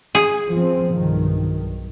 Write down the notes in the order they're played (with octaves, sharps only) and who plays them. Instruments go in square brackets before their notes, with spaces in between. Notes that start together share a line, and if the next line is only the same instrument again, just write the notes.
[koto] G#4
[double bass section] F3 C4
B1 G2 D#3